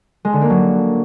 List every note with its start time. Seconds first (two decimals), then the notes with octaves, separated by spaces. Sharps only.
0.25 G#3
0.33 D3
0.41 A#3
0.50 F#3